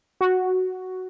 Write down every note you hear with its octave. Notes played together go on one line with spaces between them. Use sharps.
F#4